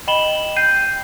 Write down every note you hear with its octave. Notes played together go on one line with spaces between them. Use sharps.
D#5 G5 B5 E7 F#7 G7
G5 G6 C7 D#7